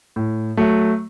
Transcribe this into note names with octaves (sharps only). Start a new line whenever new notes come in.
A2
F#3 A3